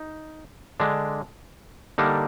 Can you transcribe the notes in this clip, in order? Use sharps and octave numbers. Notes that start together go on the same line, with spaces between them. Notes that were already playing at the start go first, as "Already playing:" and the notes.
Already playing: D#4
D3 G#3 D4
D3 G3 A#3 D4 D#4